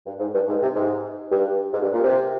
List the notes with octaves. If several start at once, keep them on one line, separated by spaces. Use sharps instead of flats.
G2
G#2
G2
G#2
C3
G#2
G2
G#2
G2
A#2
C3